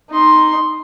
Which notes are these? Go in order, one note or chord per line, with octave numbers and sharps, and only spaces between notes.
D#4 C6